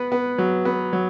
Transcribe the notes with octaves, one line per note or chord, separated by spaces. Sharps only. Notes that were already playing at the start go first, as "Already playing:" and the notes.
Already playing: B3 B4
B3
F#3
B3
F#3